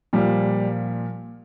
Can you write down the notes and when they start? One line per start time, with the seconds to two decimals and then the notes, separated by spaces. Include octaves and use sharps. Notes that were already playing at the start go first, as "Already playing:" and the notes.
0.13 A#2 F3 G3